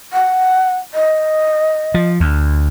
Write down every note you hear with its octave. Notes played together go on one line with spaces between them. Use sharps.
F#5
D#5
F3
D2